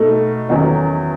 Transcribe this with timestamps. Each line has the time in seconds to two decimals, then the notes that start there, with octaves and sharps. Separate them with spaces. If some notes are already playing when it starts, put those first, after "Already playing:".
Already playing: B2 A3 D#4 A4
0.49 E2 D#3 F#3 C#4 D#5